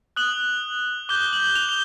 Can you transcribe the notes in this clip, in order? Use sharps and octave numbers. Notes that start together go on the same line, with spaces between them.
D#6 F#6 F#7
D6 G6 G7
F#7
F7
G7